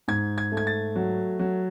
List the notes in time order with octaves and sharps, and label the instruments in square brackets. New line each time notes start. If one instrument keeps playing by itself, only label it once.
[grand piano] G#2 G#6
G#6
A3
G#6
A6
F#3
F#3